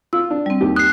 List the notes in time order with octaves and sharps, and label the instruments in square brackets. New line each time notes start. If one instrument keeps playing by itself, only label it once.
[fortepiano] F4 [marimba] E6
[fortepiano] D4
[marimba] G3 C4
[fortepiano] D#2 G4
[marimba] D#6 [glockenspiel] F#6 C7